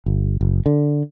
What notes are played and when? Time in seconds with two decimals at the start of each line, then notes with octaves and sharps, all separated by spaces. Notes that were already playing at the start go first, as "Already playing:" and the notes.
0.06 G1
0.41 F#1
0.66 D3